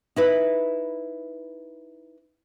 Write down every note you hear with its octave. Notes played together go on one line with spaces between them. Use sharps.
D#4 E4 B4